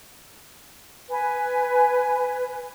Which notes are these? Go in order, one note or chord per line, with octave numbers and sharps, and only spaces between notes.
B4 G#5